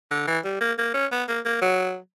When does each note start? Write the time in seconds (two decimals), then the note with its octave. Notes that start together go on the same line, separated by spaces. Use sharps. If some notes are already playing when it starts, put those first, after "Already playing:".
0.11 D3
0.27 E3
0.45 G3
0.61 A#3
0.78 A#3
0.94 C#4
1.11 B3
1.28 A#3
1.45 A#3
1.62 F#3